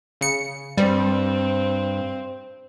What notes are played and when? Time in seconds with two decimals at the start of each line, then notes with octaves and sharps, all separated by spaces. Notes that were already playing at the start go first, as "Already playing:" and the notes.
0.21 C#3 C#7
0.78 G2 G3 C4